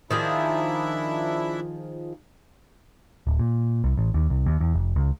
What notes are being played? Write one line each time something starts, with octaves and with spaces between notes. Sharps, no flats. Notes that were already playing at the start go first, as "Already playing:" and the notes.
D#3 F3 D4 E4 G#4 E5
D1
A#2
C2
A1
D#2
C2
D#2
E2
F1
C#2